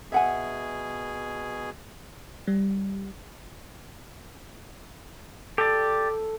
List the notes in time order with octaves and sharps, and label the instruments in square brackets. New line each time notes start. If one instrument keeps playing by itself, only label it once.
[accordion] B2 G#4 [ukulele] E5 F#5 G#5
[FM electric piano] G3
[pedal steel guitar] G4 D5 [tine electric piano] A4